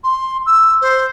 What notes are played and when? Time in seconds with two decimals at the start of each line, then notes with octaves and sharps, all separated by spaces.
0.04 C6
0.46 E6
0.81 C5